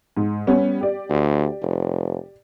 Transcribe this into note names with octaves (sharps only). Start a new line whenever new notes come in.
G#2
G3 B3 C#4
G4 D5
D2
F1